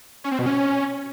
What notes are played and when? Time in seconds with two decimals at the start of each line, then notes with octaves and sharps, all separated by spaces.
0.24 C#4
0.31 C4
0.39 B2
0.46 C#4